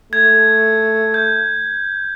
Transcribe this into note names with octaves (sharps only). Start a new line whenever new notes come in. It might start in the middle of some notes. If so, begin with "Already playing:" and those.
A3 G#6
G6